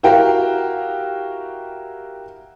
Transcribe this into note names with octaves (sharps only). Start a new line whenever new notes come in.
E4 F#4 G4 A#4 F5 G5